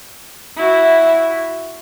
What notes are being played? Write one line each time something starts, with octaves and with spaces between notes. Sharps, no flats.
E4 F#4